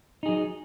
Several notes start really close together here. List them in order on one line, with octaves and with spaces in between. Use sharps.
D#4 G#4 F#3